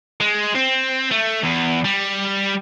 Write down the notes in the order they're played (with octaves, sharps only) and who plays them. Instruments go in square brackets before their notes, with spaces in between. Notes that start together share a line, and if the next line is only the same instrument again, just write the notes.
[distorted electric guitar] G#3
C4
A3
E2
G3